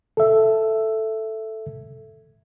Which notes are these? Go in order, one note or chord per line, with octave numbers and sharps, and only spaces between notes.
A4 E5